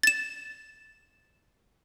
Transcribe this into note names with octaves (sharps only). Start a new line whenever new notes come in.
A6 E7